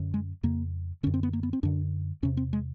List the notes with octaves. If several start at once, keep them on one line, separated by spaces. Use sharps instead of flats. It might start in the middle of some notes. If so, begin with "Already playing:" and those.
Already playing: F#2 D3
G#3
F2 C#3 A#3
F#2 D3 C#4
C4
B3
A#3
B3
C4
F#2 D3 D4
E2 C3 C#4
C4
G#3